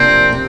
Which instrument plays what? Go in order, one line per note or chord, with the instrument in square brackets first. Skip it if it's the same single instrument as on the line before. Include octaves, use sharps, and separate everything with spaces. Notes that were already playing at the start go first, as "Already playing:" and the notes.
Already playing: [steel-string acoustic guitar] C3 F3 A#3 D4 [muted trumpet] C4
[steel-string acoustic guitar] C3